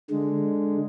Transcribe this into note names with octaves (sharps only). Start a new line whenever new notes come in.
D3 G#3